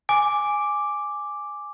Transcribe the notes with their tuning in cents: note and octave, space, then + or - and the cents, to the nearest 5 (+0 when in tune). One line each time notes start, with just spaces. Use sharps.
G#5 +0 D6 +0